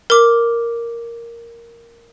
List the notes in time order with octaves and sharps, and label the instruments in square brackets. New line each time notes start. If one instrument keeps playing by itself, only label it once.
[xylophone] A#4 D6